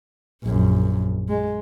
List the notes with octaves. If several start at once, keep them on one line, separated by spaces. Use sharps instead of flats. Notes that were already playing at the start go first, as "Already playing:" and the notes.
A#1 F#2
G#3